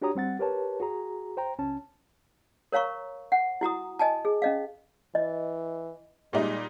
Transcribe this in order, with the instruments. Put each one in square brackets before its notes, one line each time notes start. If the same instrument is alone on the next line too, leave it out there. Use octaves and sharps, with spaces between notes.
[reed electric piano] D4 F#4 G4 C#5 A#5 D#6
G3 C4 F#5 A6
G4 A#4 B4 C#5 A5
F#4 G#4 A#5
C5 G5 A#5
C#2 C#4 A5
[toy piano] A#4 C#5 F5 A#5 C#6
F#5
E4 F#4 A#5 D#6
D#5 G#5 A5
G#4
C#4 D#5 F5
[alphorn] E3 [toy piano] D#5
[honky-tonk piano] A#2 G3 D#4 [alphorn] G#3